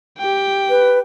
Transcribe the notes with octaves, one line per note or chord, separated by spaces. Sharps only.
G4 G5
B4